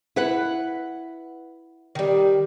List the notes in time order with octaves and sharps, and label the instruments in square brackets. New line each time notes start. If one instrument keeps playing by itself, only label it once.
[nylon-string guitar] E4 B4 F#5
[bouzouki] D#3 G3